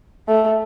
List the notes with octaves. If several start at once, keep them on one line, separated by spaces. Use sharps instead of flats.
A3